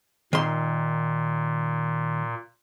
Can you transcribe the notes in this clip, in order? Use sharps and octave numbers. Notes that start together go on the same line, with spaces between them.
A#2 D#3 C6